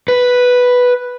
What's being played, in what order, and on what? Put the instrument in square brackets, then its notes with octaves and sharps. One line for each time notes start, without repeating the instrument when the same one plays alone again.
[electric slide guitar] B4